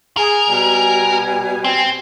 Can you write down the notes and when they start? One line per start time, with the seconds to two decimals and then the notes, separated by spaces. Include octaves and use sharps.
0.17 G#4 A#4
0.50 B2 G3 G#5
1.64 C4